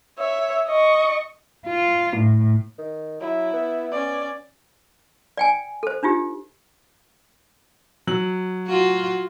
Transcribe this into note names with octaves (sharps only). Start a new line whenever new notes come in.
C#5 E5
D#5 C#6
F4
A2
D#3
F#3 E4
B3
C#4 D5
D5 G5 G#5
A4 C5
D4 D#4 F4 G4
F#3 F#7
F4 F#4